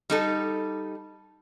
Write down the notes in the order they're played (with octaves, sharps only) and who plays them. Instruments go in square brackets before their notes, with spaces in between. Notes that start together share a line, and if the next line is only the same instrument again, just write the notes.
[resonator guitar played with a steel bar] G3 D#4 A4